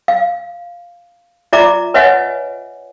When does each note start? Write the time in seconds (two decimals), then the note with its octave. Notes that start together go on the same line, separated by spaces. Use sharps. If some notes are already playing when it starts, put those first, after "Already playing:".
0.08 F5
1.53 F4 D5 E5 A#5 D6
1.94 B4 C#5 D#5 E5 F#5 G#5